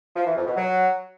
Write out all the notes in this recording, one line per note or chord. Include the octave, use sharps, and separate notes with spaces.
F3
E3
F2
B2
F#3